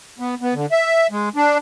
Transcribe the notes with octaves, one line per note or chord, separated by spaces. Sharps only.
B3
B3
D3
E5
G#3
D4